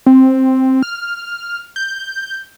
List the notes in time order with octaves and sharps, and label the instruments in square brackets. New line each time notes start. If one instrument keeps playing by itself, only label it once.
[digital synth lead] C4
F6
G6